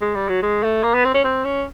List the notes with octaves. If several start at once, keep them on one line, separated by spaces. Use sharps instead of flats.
G#3
G3
F#3
G#3
A3
A#3
B3
C4
C#4
C4
C#4